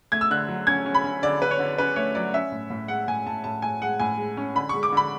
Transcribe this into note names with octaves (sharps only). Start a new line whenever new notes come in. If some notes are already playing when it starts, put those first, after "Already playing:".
A3 G#6
E6
D3 F#6
F#3
C#4 G#6
C#4
B5
C#4
D3 D5
D3 B4
C#5
D3
C#4 B4
A3 C#5
F#3 D5
C#4 E5
A2
A2
G#3 F#5
A2 G#5
A2 A5
A2 A5
A2 G#5
G#3 F#5
A2 G#5
G#3
C#4
D3 B5
G#3 C#6
D6
D3 B5